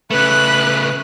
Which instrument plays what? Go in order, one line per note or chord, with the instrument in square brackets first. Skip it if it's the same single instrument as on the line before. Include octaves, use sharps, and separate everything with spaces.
[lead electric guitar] C#3 A3 [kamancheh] B4 F#6